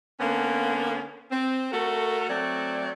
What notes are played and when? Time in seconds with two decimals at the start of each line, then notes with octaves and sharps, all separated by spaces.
0.20 D3 A#3 B3 C#4
1.31 C4
1.72 A3 F#4 A4 A#4
2.29 F#3 A3 C4 D5